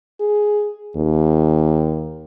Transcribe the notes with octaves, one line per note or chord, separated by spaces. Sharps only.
G#4
D#2